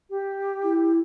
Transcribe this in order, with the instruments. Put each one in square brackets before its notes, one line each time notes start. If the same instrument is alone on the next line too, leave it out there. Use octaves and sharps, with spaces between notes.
[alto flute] G4
[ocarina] E4